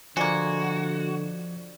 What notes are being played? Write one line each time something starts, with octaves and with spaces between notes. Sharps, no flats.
D3 F3 G#3 A#3 F#4 D5 G#6